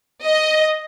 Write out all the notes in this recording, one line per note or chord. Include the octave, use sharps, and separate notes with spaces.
D#5